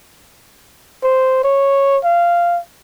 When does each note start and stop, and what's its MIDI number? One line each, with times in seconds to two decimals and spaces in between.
1.04 1.41 72
1.44 1.98 73
2.04 2.59 77